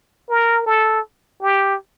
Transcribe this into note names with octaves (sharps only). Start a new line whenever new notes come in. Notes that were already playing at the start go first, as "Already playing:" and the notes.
A#4
A4
G4